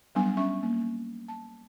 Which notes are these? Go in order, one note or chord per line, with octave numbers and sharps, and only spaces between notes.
F#3 G3 B3 D4 F#5 G#5
C#4 E5 C#6
A#3
A5